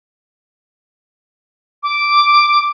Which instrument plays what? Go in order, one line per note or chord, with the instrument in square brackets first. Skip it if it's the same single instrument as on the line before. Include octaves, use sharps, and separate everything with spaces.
[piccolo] D6